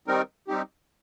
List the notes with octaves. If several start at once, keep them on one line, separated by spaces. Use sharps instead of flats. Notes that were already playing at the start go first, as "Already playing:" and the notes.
D#3 G3 C4 D#4 A#4
G3 C4 D#4 G4